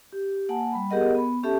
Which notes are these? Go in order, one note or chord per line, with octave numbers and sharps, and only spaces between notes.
G4
A#3 F#5 G#5 A5
G3 B5
B3 G4 G#4 A#4 D#5 F#5
B3 B5
C#4 G4 A4 E5 A5